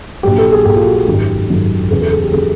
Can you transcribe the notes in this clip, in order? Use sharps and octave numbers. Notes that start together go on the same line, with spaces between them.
A#1 A#2 F#3 G4
A4
G#4
A#1 A#2 F#3 G4
F4
F#4
G4
G#1 F#2 D#3 F#3
G#1 F#2 D#3 F#3
E2 C#3 F#3 G#4
A4
G#4
G4
C#3 F#3 G#4